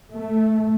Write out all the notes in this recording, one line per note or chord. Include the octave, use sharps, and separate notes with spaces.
A3